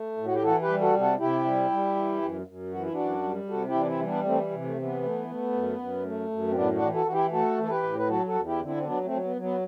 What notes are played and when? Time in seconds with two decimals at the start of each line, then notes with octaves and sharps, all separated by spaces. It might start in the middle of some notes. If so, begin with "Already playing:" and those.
Already playing: A3
0.17 A2
0.26 F#4
0.34 G4
0.43 E3 F#4 A4
0.62 G4 B4
0.68 G3
0.81 F#4 A4
0.94 C3
1.00 F#4 A4
1.19 C3 E4 G4
1.45 G3
1.70 G3
1.96 E3
2.22 F#2
2.47 F#2
2.72 E3 F#4
2.82 E4
2.93 F#2 D4 F#4
3.23 G3
3.49 C3 F#4 A4
3.68 E4 G4
3.74 E3 D4
3.87 C4 E4
4.00 G3
4.06 B3 D4
4.25 E3 A3 C4
4.51 C3
4.64 A3
4.76 E3
4.83 B3
5.03 A3
5.28 A3
5.53 F#2
5.78 F#2
6.04 A3
6.30 F#2
6.51 C4
6.55 A2 B3 D4
6.75 D4 F#4
6.81 E3
6.94 F#4 A4
7.06 E3 F#4
7.13 E4 G4
7.32 A3 F#4 A4
7.58 E3
7.63 A4
7.70 G4 B4
7.83 A2
7.98 B4
8.08 F#3 F#4 A4
8.27 F#4 A4
8.34 E2
8.46 E4 G4
8.60 D3
8.66 C4 E4
8.76 C4
8.85 F#3 B3 D4
9.04 A3 C4
9.10 F#3
9.24 B3
9.36 F#3
9.43 B3